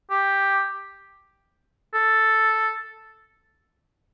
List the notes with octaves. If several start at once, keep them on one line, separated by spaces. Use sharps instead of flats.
G4
A4